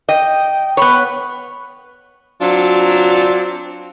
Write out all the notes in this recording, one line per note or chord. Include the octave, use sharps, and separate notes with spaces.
D#5 G5
B3 C#5 B5
F#3 C4 D4 F4